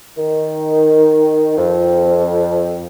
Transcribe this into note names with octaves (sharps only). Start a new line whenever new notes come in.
D#3
F2